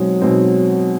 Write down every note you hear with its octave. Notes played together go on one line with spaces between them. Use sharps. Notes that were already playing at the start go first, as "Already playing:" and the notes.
Already playing: B2 F#3 G#3 C4 D#4
B2 G#3 C4 D#4